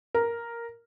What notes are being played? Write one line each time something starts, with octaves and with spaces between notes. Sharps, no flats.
A#4